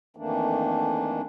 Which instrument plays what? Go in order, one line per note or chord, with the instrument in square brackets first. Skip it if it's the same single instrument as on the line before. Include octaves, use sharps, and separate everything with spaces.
[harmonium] F2 D#3 E3 A3 A#3 D4